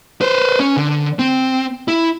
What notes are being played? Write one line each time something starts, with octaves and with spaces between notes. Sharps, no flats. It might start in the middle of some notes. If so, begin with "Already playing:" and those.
B4 C5
C#4
D3
C4
E4